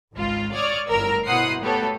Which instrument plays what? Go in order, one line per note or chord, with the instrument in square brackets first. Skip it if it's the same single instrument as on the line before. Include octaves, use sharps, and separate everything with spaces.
[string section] G#1 C#2 F4
C#5 D5 C#6 D#6 F6 G#6
G1 A2 A#4 E6
B2 E4 C5 F#5 D#6 C7
A3 B3 F#4 G4 A4 C#5